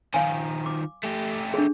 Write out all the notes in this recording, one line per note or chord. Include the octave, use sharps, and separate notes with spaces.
D#3 F3 F5 G#5
D6
A3 G4
D4 G#4